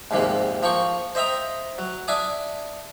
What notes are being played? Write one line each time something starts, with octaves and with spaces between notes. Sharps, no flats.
A#1 D#2 G#2 C3 A#3
F3 A#3 G5 C#6
C5 D#5 E5 G5 A#5
F#3
D4 E5 G#5 D6 D#6